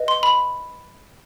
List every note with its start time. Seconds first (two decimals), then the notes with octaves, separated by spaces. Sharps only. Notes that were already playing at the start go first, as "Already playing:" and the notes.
Already playing: B4 D#5
0.08 C6
0.23 B5